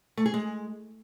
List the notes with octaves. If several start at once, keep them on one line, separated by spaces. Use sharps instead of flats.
A3
G#4
G#3